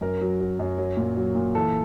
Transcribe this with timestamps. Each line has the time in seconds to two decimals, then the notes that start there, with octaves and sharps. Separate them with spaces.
0.01 F#2 A#4
0.21 F#3
0.41 F#3
0.59 F#2
0.78 F#3
0.97 A#2
1.17 F#3
1.35 A#2
1.55 E3 A4